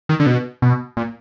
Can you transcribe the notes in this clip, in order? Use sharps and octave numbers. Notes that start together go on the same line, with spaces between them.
D#3
D3
B2
B2
A#2